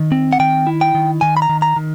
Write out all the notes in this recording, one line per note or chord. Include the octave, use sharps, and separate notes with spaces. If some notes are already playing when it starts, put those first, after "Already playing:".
Already playing: D#3
C4
F#5
D#3 G5
E4
G5
D#3
D#3 G#5
B5
A#5
D#3
A#5
D#3